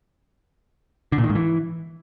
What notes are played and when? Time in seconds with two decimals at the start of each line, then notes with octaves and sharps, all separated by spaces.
1.12 D3
1.18 A#2
1.24 D#3
1.30 G#2
1.35 E3